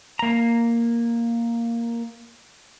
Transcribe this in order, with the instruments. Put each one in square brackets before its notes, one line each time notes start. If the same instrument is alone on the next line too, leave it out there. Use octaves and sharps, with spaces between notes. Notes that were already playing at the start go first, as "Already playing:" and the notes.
[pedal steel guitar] A#3 A#5